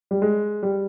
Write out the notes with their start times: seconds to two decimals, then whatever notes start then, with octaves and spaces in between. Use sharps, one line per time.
0.11 G3
0.22 G#3
0.63 G3